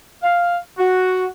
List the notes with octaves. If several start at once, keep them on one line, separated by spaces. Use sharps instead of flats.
F5
F#4